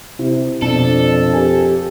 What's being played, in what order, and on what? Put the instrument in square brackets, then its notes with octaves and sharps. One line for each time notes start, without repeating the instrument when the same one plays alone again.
[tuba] C3 [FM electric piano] E4
[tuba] F2 [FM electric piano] B2 [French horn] D4 [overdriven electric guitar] A4
[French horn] G4 [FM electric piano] A#4 G#5